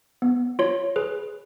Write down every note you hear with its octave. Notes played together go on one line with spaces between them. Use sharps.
B3
F4 C#5
G#4 B4